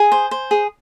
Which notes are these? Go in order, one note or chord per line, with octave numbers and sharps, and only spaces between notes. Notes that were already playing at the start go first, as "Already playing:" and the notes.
Already playing: G#4 G#5
C5
C5
G#4